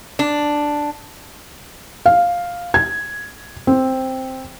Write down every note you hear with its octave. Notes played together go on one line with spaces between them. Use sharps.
D4
F5
G#6
C4